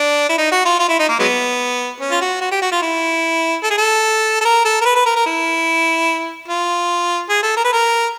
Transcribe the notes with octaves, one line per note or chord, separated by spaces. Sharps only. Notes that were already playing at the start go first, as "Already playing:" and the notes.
Already playing: D4
E4
D#4
F#4
F4
F4
E4
D#4
A#3
F#3 G#3 B3
C#4
F4
F#4
F#4
G4
F#4
F4
E4
A4
G#4
A4
A4
A#4
A4
A#4
B4
B4
A#4
A#4
E4
F4
G#4
A4
A#4
B4
A#4